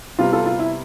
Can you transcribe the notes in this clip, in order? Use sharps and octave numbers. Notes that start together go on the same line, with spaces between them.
C3 G3 B3 F4
F4 A4
F4
E4